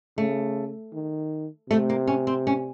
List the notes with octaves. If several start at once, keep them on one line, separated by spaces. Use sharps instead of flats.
C#3 A3
D#3
C3 A3
A#3
C#4
C4
C#4